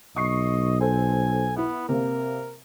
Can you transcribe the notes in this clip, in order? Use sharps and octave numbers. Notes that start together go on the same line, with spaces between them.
B1 D#5 C#6 C7
A4 C5 G#5
B3 E4
C3 A#3 A#4